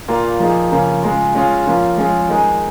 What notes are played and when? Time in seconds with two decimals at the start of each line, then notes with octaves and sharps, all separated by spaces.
0.08 A#2 A#3 F4
0.40 F3 A#3 D#4 G#4
0.72 C#3 F3 A#3 C#4
1.03 C#3 G#3 F4
1.35 G#3 C#4 F4 G#4
1.66 F3 A#3 C#4 F4
1.98 F3 G#3 C#4 F4 G#4
2.29 D#3 G#3 D#4 G#4